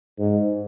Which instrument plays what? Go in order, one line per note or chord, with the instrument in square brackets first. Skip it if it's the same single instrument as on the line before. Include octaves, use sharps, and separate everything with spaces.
[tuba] G#2